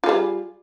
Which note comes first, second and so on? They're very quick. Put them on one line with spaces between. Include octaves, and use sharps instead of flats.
F4 G#4 G3